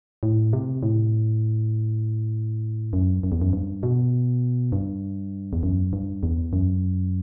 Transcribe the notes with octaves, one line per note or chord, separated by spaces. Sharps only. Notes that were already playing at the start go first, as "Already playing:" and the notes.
A2
C3
A2
F#2
F#2
E2
F#2
G2
B2
G2
E2
F#2
G2
E2
F#2